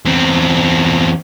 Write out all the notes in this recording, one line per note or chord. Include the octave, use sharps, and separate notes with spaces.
E2 C4